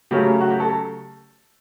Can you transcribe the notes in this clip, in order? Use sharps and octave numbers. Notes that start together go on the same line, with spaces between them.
C#3 F#3 A3 C#4 G4
F#4
G4
A4